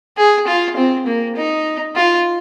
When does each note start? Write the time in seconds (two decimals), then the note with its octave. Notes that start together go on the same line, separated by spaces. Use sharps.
0.17 G#4
0.47 F4
0.77 C4
1.07 A#3
1.37 D#4
1.96 F4